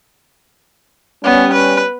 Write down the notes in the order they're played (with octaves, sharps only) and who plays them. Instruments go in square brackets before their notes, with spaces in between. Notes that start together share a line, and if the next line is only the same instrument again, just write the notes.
[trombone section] G3 C#4 [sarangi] B3
[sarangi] B4